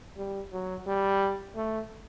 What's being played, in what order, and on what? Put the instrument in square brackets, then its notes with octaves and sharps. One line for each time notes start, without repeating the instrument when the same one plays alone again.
[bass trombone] G3
F#3
G3
A3